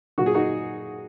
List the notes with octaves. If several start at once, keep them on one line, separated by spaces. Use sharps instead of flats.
A#2 F#3 F#4
G#4
D#4 F#4